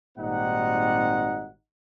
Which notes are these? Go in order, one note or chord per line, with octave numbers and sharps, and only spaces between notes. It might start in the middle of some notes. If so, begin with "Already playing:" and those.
G#1 A#2 G3 C4 D#4 F#5